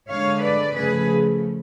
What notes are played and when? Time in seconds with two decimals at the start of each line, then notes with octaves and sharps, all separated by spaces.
0.09 D3 G#3 C#5 F5
0.42 B4 D5
0.75 C#3 F3 A3 G#4 B4